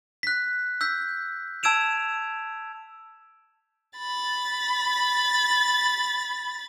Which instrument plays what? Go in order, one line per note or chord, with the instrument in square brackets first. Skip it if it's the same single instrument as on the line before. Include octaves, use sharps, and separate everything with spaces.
[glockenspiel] F#6 B6
E6 G6 B6
A5 E6 G#6 D7 E7 F7
[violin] B5 A6